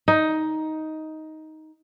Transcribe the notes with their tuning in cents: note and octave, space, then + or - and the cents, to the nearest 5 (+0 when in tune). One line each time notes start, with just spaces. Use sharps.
D#4 +10